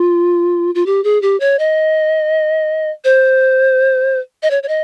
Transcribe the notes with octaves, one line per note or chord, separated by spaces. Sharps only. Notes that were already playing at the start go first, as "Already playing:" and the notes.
Already playing: F4
F4
G4
G#4
G4
C#5
D#5
C5
D#5
C#5
C#5
D#5